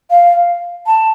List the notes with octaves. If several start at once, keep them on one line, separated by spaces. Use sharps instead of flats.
F5
A5